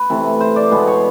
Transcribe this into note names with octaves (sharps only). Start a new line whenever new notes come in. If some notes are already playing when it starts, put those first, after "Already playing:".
Already playing: B4
C3 E3 A3
C5
D5
B2 G#3 B3 C5
C#5